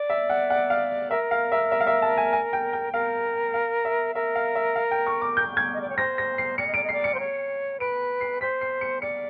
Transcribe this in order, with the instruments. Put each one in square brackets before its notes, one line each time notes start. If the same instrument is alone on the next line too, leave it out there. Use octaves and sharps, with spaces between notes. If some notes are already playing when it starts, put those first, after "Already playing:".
Already playing: [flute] D5
[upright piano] E5
F#5
F#5
F5
[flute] A#4 [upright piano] E5
[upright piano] F5
E5
E5
F5
E5
A5
G#5
G#5
G5
G5
[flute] A#4 [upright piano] F5
[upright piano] F5
E5
[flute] A#4 [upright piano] E5
[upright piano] F5
E5
F5
G5
C#6
D6
G6
G#6
[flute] D#5
D5
C#5
[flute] C5 [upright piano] A#6
[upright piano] A#6
C7
[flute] D5 [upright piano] C#7
[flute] D#5
[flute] D5 [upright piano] D7
[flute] D#5
[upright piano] C7
[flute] D5
[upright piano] C#7
[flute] C5
C#5
[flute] B4 [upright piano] D7
[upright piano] C7
[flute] C5 [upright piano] B6
[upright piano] C7
C#7
[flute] D5 [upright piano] C#7